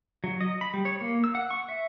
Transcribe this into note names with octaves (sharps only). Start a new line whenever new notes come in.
F#3
D#5
B5
G3
C#5
A#3
E6
F#5
C#6
E5